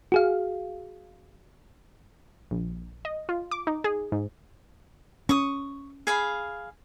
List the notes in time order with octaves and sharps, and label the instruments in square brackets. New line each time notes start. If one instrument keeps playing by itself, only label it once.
[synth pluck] F#4 G#4 F5
[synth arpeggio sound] A#1
D#5
F4
D6
D#4
G#4
G#2
[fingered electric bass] C#4 [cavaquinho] C#6 D#6
[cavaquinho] G#4 F5 B5